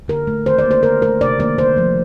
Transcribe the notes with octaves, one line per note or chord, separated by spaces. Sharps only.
D3 A#4
A3
D#3 C5
D5
A#3
C5
D3 A#4
A3 A#4
C3 D5
D#3 G3 A#3 D5
D3 C5
F3 A3